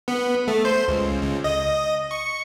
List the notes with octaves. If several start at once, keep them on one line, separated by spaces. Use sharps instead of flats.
B3
A3
C5
C#2
C#2
D#5
C#6